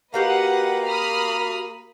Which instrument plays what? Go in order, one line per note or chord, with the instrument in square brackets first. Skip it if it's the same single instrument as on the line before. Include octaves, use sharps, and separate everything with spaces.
[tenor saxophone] A#3 [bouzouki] F#4 G4 F5 [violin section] B4 D#5 F#5
[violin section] B5 D#6 F6